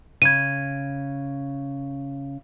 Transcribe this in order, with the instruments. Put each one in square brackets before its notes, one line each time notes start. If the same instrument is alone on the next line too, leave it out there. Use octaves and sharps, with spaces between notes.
[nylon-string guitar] C#3 [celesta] G#6 D#7